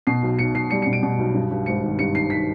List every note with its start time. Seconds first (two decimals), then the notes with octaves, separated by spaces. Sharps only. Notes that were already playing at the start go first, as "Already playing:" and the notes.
0.07 B2 C7
0.23 B1
0.39 B1 C#7
0.55 B1 C7
0.70 G3 C#7
0.82 C#7
0.87 B2
0.93 D7
1.03 B2
1.19 B1
1.34 G2
1.51 G2
1.66 G#1 C#7
1.83 D#3
1.99 G2 C#7
2.14 D#3 C7
2.30 D#3 B6